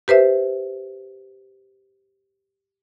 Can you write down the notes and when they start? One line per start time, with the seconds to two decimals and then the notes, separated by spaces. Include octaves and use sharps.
0.08 G4 B4 C5 E5